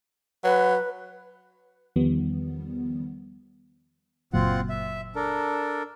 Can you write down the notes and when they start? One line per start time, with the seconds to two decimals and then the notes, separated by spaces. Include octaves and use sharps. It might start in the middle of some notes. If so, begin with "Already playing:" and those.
0.44 F#3 B4
1.96 E2 D#3 F3 G3 B3
4.33 F#1 A#2 F#3 C4 F4 F#5
4.69 E5
5.16 D4 A4 A#4